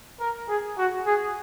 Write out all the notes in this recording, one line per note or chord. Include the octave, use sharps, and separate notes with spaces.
A#4
G#4
F#4
G#4